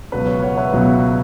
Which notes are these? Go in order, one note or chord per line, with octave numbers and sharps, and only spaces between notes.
C#2 B2 F#3 B4
C#5
C#5 F#5
B4 E5
C#2 B2 F#3